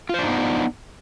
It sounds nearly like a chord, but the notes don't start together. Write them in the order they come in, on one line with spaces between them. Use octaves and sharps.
F4 C5 D4 D#4 B3